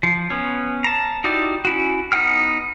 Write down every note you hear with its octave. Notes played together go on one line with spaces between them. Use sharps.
F3
B3 C#4
A5 A#5
D#4 E4 F#4 G4 D5
C#4 E4 F#4
B3 D#4 F#5 G5 F6